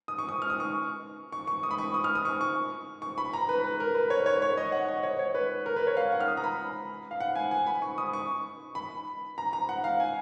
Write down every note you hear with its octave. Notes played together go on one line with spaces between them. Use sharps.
D#6
C#6
D#6
F6
D#6
C#6
C#6
C#6
D#6
B5
C#6
D#6
F6
D#6
C#6
C#6
C#6
B5
A#5
B4
B4
A#4
B4
C#5
C#5
C#5
D#5
F#5
D#5
C#5
C#5
B4
A#4
B4
C#5
F5
F#5
F6
D#6
A#5
B5
F5
F#5
G#5
G#5
B5
C#6
D#6
C#6
B5
A#5
A#5
F#5
F5
G#5